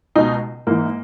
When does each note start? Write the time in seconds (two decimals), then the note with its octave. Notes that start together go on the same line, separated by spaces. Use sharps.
0.16 C#2 B2 D#4
0.67 G#2 E3 A#3